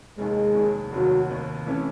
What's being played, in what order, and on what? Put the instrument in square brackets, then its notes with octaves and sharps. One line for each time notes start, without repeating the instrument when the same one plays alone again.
[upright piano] F1 D#2 D#3 [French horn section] G#3
[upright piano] F1 D#2 D#3
[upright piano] F1 D#2 D#3 [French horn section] F#3
[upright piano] F1 D#2 D#3
C3 E3 A3 C#4